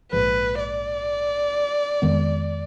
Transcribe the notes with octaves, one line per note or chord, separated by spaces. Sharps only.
A#1 G#2 F3 B4
D5
F2 D#3 G#3 B3